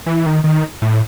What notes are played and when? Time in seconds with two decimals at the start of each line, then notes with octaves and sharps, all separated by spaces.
0.06 E3
0.26 D#3
0.44 D#3
0.82 A2